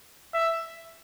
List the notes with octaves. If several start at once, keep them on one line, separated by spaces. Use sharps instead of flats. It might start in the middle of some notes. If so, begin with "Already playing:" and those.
E5